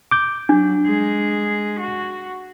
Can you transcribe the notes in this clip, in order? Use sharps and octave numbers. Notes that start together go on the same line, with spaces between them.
D6 G6
F#3 D4
G#3 G#4
F#4